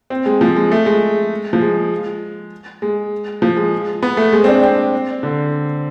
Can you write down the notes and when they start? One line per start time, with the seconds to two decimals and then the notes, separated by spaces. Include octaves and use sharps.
0.10 C4
0.26 G#3
0.41 F3
0.56 G#3
0.72 A3
0.86 G#3
1.53 F3
1.61 G#3
2.82 G#3
3.42 F3
3.57 G#3
4.03 B3
4.17 A3
4.33 G#3
4.44 C4
4.48 D4
4.63 C4
5.23 D3